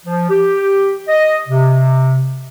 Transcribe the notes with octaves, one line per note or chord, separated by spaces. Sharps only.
F3
G4
D#5
C3